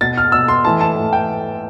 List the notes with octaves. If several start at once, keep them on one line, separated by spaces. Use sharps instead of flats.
B2 A6
F6
B2 E6
C6
A2 E3 A5
A5
A2 E3
G5